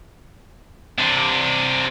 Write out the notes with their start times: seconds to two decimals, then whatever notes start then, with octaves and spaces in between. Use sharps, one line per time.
0.98 C3 D4